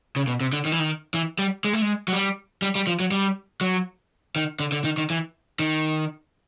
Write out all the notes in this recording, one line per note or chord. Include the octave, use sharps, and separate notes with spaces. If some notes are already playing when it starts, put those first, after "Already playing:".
C#3
B2
C3
D3
D#3
E3
D#3
E3
G3
G#3
A3
G#3
F#3
G3
G3
G3
F3
F#3
G3
F#3
D#3
D3
D3
D#3
D#3
E3
D#3